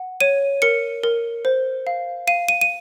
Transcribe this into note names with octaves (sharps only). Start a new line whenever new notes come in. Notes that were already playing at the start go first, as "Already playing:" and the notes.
Already playing: F#5
C#5 D#7
A#4 C#7
A#4
C5
F5
F5 D#7
D#7
D#7